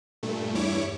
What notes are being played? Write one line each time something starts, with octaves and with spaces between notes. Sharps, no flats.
G2 A#2 A3
E2 G2 E4 C#5 D6